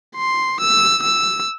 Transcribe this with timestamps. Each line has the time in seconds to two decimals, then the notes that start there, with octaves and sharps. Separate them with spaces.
0.16 C6
0.60 E6
1.03 E6